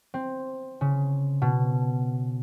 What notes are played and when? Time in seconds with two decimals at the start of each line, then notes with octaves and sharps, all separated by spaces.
0.14 C4
0.81 C#3
1.42 B2